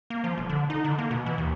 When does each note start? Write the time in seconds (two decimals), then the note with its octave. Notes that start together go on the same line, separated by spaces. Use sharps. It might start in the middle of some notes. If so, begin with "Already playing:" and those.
0.10 A#3
0.24 F3
0.38 E1
0.49 D3
0.70 D#4
0.84 D3
0.98 A#3
1.11 B2
1.26 E3
1.38 D#2